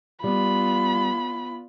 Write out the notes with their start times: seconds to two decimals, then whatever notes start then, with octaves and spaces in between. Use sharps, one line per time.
0.24 G3 B3 F4 B5